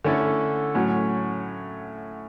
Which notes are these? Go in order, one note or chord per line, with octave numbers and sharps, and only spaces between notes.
D3 A3 C#4 E4 A4
A2 F#3 A3 C#4